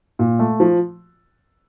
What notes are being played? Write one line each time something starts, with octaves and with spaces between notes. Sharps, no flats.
A#2
A3
F3